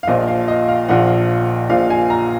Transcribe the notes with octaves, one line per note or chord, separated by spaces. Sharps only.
F5
A#1 A#2 F3 D#5
F5
D#5
F5
A#1 A#2 F3 F#5
A#1 A#2 F3 F5
G#5
A#5